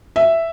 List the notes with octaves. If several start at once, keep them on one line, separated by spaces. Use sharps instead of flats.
E5